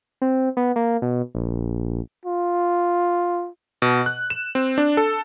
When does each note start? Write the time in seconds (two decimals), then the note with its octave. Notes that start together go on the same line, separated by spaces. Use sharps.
0.22 C4
0.57 B3
0.76 A#3
1.02 B2
1.35 A#1
2.26 F4
3.82 B2
4.06 F#6
4.30 E7
4.55 C4
4.78 D4
4.97 A4